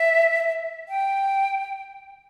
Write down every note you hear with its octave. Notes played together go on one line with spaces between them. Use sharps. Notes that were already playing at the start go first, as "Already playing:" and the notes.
Already playing: E5
G5